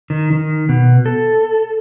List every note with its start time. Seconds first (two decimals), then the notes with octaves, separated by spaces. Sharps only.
0.10 D#3
0.33 D#3
0.69 B2
1.06 A4